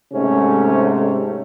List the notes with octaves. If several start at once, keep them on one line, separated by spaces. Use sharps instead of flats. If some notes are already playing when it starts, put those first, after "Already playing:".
G#2 C3 A3 C#4